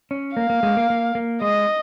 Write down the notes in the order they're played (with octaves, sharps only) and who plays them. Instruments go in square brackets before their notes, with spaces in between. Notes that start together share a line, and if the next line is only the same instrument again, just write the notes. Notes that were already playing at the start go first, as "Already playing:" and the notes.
[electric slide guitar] C#4
[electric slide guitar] A#3 [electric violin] F5
[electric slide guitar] A#3
G#3
A#3
A#3
A#3
[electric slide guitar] G#3 [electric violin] D#5